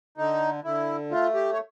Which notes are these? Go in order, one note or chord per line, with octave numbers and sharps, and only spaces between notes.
D3 D#4
D3 E4
A3 F4
G4
C#5